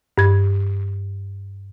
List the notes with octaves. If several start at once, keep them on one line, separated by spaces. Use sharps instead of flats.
G2 G#6